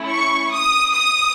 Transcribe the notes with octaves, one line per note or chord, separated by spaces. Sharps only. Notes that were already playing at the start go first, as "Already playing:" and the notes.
Already playing: A3 C#4 E4
C#6
D#6
D#6